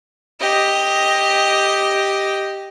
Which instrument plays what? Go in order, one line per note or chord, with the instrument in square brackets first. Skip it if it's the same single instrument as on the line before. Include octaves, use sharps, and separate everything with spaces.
[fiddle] G4 D#5